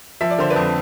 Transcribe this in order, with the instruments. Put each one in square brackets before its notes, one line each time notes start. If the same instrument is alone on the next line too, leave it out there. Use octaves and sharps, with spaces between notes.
[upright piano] F3 E5
D5
D3 C5
B4 D5
F2